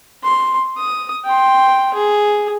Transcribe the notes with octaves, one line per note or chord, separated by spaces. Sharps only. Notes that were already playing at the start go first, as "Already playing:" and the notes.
C6
D#6
G5 C6
G#4